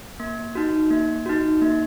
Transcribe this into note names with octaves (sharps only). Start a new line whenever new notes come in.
A#3
D#4 F#4
A#3
D#4 F#4
A#3